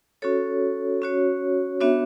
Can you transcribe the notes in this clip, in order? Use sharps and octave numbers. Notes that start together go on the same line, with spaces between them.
C#4 F#4 A4 C#5
C#4 F#4 C#5
B3 D4 F#4 C#5 E5